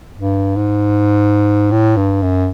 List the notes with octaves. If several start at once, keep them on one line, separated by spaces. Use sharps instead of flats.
G2
G#2
A2
G2
F#2